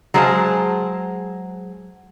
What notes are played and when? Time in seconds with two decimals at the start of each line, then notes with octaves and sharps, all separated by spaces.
0.14 F#3 G#3 G#4 C5 F5 A5